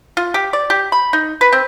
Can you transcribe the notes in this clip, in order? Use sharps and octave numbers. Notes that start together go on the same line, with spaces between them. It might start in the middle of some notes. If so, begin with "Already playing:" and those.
F4
G4
D5
G4
B5
D#4
B4
C4